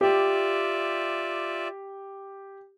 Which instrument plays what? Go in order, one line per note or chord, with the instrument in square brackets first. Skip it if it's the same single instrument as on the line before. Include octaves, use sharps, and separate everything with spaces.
[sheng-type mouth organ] F4 D5 E5 [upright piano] G4